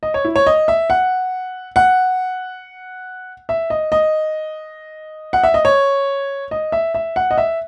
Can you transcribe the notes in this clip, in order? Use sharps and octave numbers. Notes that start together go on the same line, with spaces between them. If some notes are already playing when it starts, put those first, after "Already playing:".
D#5
C#5
E4
C#5
D#5
E5
F#5
F#5
E5
D#5
D#5
F#5
E5
D#5
C#5
D#5
E5
E5
F#5
D#5
E5